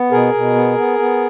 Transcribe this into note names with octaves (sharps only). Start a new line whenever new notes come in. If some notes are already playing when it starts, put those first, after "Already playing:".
Already playing: B3
B2 G#4 A#4
B2
B3
B3
B3